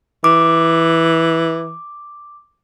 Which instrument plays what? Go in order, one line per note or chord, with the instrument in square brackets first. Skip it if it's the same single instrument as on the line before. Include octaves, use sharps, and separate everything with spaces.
[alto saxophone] E3 [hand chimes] D6